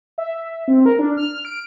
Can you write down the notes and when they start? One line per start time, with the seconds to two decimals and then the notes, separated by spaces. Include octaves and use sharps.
0.18 E5
0.68 C4
0.86 A#4
0.99 D4
1.17 F6
1.45 D7